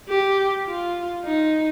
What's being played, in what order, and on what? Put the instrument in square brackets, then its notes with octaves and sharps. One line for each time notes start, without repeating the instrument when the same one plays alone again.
[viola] G4
F4
D#4